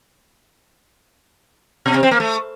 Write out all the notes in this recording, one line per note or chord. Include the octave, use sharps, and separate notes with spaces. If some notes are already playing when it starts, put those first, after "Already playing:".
B2
C3
C4
A#3
A3